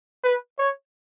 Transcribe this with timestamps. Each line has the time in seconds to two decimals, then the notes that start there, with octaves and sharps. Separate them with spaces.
0.24 B4
0.59 C#5